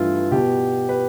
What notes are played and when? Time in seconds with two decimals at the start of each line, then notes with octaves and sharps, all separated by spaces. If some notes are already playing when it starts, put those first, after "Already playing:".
Already playing: G2 E3 A3 E4 F4
0.31 B2 B3 G4
0.89 B4